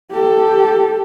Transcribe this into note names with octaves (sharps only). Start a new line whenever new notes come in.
G4 A4